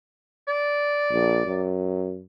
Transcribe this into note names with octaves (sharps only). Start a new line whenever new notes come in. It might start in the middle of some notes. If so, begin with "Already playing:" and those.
D5
A#1
F#2